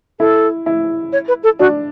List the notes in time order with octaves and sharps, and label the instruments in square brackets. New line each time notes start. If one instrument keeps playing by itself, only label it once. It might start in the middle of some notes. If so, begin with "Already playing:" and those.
[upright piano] E4 [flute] A4
[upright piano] E4
[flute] C#5
B4
A4
[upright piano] D4 [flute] F#4